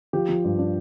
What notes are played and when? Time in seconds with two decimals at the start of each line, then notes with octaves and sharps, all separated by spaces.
0.13 F3 G4
0.29 F3
0.44 G2
0.59 D4